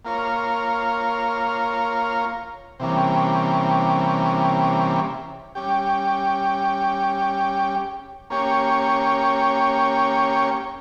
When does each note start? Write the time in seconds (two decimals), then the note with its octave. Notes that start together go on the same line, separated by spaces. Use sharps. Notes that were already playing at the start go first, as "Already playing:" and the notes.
0.05 A#3 F4 A#4 C#5
2.80 C3 E3 G3 A#3 C#4
5.55 G3 C#4 G4
8.30 A#3 C#4 G4 C#5